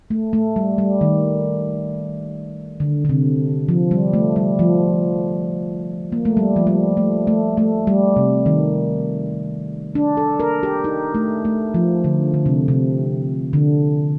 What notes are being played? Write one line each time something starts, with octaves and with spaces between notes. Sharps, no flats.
A3
A3
G3
G3
D#3
D3
D3
C3
F3
G3
A3
G3
F3
A#3
A3
G3
F3
G3
A3
A3
A3
G3
C3
D#3
D4
A4
A#4
G4
D#4
A3
A3
F3
D3
D3
C3
C3
D3